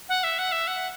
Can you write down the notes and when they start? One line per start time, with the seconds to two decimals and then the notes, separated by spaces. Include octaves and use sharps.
0.09 F#5
0.23 E5
0.39 F#5
0.52 E5
0.67 F#5